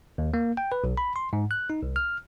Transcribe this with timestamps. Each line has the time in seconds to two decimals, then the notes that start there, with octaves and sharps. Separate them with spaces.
0.18 D#2
0.34 A#3
0.57 G5
0.72 B4
0.84 B1
0.97 B5
1.16 C6
1.33 G#2
1.51 F#6
1.70 D#4
1.83 C2
1.96 F6